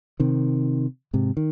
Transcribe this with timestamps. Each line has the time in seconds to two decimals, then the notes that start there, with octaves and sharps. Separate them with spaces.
0.20 C3 D#3
1.13 G#2 C3
1.37 D#3